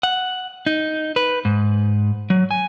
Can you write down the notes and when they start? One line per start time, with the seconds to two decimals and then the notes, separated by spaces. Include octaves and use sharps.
0.03 F#5
0.66 D#4
1.16 B4
1.45 G#2
2.30 F#3
2.51 G#5